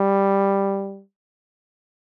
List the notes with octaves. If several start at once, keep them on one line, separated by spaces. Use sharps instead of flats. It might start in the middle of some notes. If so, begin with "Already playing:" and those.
Already playing: G3